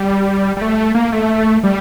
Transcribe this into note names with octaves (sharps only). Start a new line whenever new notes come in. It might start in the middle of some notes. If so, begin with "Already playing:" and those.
Already playing: G3
G3
A3
A#3
A3
G3